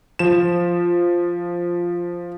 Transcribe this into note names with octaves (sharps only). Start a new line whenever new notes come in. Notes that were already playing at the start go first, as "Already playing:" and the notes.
F3 E7